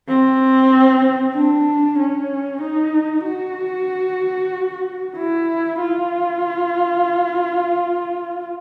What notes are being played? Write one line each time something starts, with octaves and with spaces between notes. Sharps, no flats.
C4
D4
C#4
D#4
F#4
E4
F4